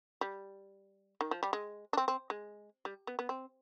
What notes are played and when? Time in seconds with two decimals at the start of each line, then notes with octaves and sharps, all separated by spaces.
0.21 G3
1.21 D#3
1.31 F3
1.43 G3
1.53 G#3
1.93 D4
1.97 C4
2.08 C4
2.30 G#3
2.85 G3
3.07 B3
3.19 B3
3.29 C4